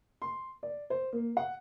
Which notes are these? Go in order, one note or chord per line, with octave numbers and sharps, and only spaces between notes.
C6
D5
C5
A#3
F#5